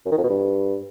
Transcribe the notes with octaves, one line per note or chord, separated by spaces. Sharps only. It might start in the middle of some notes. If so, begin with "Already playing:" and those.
F#2
D#3
F2
B2
G2